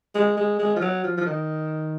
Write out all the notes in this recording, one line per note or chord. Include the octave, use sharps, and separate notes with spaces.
G#3
G#3
G#3
F3
F#3
F3
F3
D#3